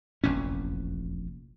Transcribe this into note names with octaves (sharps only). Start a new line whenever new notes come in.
F1 A#1 E2 C#4